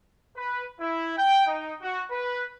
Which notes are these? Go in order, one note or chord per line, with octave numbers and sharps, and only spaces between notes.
B4
E4
G5
D#4
F#4
B4